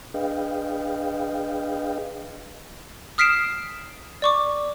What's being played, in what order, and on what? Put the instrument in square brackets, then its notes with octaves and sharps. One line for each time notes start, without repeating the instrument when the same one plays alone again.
[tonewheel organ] D4 G#4 B4 D#5 F5 G5
[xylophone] D#6 F6 B6 C7 D7 E7
D5 C#6 D6